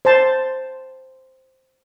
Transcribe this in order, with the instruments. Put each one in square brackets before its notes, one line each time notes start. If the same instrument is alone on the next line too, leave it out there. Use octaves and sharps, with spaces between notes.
[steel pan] C5 A5